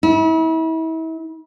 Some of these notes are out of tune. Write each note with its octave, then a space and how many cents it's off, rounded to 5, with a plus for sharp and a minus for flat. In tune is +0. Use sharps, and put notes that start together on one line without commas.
E4 -35